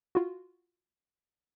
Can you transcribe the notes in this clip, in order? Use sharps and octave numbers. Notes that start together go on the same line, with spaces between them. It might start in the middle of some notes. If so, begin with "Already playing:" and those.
F4 F#4